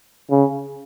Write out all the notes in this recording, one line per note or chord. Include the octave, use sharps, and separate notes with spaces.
C#3